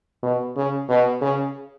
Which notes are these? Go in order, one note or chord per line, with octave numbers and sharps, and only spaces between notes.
B2
C#3
B2
C#3